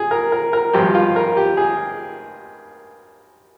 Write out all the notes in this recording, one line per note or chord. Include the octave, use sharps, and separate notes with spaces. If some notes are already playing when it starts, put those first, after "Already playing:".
Already playing: G#4
A#4
A#4
A#4
G#1 G2 F3 G4
F4
A#4
G4
G#4